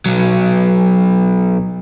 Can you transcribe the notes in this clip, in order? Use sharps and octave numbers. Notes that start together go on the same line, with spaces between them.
B1 F#3